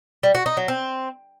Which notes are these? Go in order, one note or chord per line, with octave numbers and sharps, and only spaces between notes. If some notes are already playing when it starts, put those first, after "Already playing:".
G3
F#4
D#4
F#3
C4